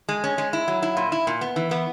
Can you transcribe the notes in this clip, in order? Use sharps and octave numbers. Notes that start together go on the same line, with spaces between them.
G#3
C#4
G#3
E4
F#3
E4
A#2
E4
A#2
B3
E3
B3